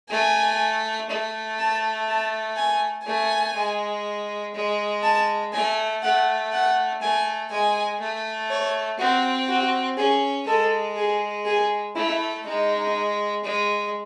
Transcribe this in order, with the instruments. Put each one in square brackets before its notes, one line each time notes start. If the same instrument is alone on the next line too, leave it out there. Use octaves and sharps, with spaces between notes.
[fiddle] A3 [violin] G#5
[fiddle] A3
[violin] A5
A5
G#5
[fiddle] A3 [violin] G#5
[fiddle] G#3
G#3
[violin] A5
[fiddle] A3 [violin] G#5
[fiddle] A3 [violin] F#5
[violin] F#5
[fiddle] A3 [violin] G#5
[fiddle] G#3 [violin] G#5
[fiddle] A3
[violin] C#5
[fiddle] C4 [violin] F#4
[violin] F#4
[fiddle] C#4 [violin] G#4
[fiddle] G#3 [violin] A4
[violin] G#4
G#4
[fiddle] A3 [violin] E4
[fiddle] G#3 [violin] D#4
[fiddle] G#3